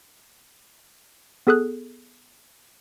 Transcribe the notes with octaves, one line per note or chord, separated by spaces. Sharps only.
B3 G#4 A4 D#6 F#6